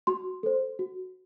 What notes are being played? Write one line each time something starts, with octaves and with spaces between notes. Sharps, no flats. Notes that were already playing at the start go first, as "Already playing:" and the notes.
F#4 C6
A4 C5
F#4